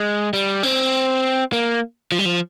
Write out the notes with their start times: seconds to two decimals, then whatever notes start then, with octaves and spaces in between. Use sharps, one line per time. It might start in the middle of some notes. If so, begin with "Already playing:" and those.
Already playing: G#3
0.33 G3
0.63 C4
1.53 A#3
2.12 F3
2.19 G3
2.25 F3